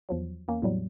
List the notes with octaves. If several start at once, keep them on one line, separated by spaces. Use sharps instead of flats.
E2 F3 F#3
E2 A#3 C#4
E2 A2 F#3 G3